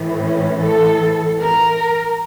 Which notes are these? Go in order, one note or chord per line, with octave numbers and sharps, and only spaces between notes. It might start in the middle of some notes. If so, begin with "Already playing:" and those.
Already playing: A2 E3
C#4
A4
A#4